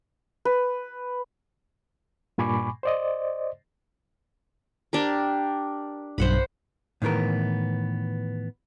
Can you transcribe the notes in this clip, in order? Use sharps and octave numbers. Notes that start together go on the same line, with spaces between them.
B4
G2 A#2 G#5 B5 C#6 D6
C5 D5 D#5
D4 G4 A#4
B1 G2 C5 F#5 B5
A2 D#3 E3 B3 A#4